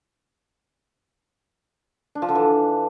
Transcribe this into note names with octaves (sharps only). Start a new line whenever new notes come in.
D4
F3
D3
E3